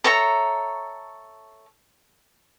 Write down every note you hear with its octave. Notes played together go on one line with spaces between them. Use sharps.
A4 C#5 E5 A#5